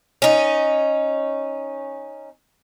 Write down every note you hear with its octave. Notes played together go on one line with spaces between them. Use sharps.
C#4 D#4